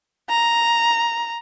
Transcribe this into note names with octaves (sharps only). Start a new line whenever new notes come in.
A#5